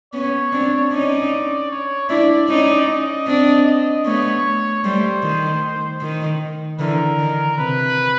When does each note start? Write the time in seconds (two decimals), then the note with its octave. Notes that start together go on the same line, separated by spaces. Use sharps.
0.13 B3 C#4 C#5
0.53 C4 D4
0.92 C#4 D#4 D5
1.71 C#5
2.09 D4 E4 D5
2.48 C#4 D#4
2.88 D#5
3.27 C4 D4
3.66 D#5
4.05 A3 B3 C#5
4.84 G3 A3 C5
5.23 D#3
6.02 D#3
6.79 D3 E3 A#4
7.19 D#3
7.58 C3 B4